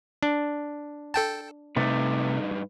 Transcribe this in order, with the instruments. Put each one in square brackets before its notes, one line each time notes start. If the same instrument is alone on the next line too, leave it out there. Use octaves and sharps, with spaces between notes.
[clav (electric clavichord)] D4
[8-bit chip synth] A4 G5 A5
[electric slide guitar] G2 D#4 B4 [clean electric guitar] C3 A3